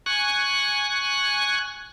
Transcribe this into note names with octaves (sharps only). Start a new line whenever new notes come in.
G#5 C#6 F#6